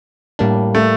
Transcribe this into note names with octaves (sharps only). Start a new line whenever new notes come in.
A2 G3 A#3 D4
A3